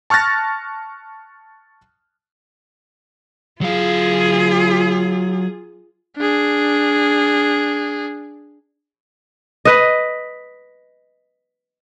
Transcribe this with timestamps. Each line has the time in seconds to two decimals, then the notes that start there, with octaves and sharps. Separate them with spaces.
0.10 A5 C#6 F6 F#6 A6 A#6
3.61 F#3 F4 G#4 F5
6.17 D4 G#4
9.65 B4 D#5